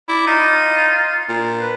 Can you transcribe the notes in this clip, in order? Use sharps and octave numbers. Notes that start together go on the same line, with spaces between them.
E4 D5
D#4 F4
A#2
B4